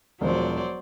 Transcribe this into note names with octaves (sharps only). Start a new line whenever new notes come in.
E1 F3 F#3 C5 D5